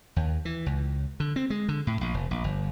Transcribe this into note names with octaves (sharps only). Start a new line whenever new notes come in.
D#2
E3
C#2
D3
C4
G#3
D3
A2
A#1
F1
A#1
G1